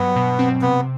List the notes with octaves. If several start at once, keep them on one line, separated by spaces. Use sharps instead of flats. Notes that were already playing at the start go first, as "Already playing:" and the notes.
Already playing: G2 F#3 B3
B2
C4
C3 B3